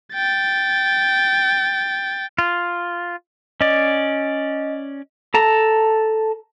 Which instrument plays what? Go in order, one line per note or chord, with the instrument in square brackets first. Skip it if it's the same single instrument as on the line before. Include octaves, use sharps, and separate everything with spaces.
[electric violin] G5 A6
[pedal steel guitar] F4
[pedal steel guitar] C#4 D5 [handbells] D#5
[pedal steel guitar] A4 A5 A#5